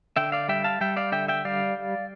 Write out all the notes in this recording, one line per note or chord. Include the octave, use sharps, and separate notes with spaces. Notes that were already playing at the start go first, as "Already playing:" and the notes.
D3 E5 G5
D5 F5
G3 E5 G5
F5 A5
G3 E5 G5
D5 F5
D3 E5 G5
E5 G5
G3 D5 F5